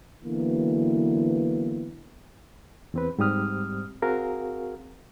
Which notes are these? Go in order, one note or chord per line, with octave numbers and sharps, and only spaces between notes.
D3 E3 F#3 A#3 B3
E2 C4 B4
G#2 G3 C4 G4 D#6 F6
C4 F#4 G#4 A#4 F5